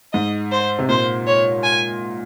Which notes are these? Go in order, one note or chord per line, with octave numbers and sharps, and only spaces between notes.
G#2 D#5
C5
C3
A#2 C5
C#5
G#5